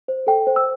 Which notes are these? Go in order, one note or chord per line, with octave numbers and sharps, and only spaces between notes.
C5
A4 G5
C5
E6